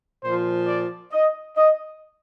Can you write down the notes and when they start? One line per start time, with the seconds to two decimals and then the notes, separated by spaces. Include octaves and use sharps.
0.23 A#2 F3 C5
0.67 D5
1.13 D#5
1.57 D#5